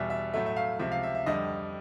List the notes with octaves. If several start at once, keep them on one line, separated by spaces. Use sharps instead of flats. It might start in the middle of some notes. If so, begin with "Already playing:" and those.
Already playing: E2 B2 G3 E5
E5
A2 F#3 A3 E5
E5
F5
C#2 C3 F3 E5
F5
E5
E5
F2 D3 G3 D#5